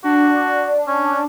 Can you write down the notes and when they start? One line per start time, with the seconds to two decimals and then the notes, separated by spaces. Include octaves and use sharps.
0.04 D4 F#4
0.87 C#4